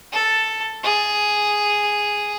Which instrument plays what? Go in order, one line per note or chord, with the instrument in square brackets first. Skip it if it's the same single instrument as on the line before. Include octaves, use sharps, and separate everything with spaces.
[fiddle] A4
G#4